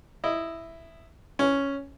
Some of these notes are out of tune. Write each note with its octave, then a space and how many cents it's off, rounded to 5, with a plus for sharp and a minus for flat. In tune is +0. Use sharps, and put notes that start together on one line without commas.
E4 +0 D#5 -5
C#4 +0 B4 +0